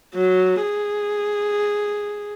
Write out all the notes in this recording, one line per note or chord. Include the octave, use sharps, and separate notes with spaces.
F#3
G#4